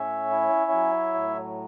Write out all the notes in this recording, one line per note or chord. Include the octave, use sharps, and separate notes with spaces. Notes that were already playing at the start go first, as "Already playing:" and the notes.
Already playing: A2 C#4 C#5 E5
E4
F#3
A2